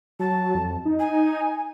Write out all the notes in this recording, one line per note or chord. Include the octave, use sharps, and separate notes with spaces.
F#3 A5
F2
D#4
G#5